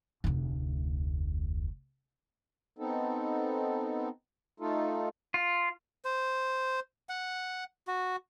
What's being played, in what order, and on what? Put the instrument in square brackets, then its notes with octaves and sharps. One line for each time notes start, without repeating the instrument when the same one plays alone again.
[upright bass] F1 D2
[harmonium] B3 C4 D#4 A4
A3 D#4 F4 A4
[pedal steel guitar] F4
[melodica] C5
F#5
F#4